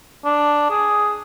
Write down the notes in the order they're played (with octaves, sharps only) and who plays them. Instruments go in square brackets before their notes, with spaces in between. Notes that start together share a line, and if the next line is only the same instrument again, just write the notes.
[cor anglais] D4
G#4